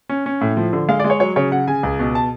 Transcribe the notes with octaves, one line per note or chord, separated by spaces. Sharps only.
C#4
C#4
A2
F3
D3
G#3 F5
D5
G#3
C#5
F#3 C#5
C#3 C#5
C#3 F#5
C#3 G#5
C#2
B2
A5